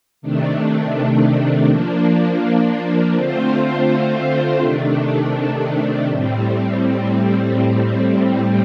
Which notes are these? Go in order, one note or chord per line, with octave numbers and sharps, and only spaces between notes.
C3 D#3 A3 D4
F3 A#3 D4
D3 A3 C4 F4 C5
C3 D#3 A3 D4
A2 G3 C4